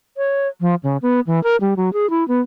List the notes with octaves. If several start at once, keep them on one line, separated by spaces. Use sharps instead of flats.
C#5
F3
C#3
B3
E3
A#4
G3
F#3
G#4
E4
B3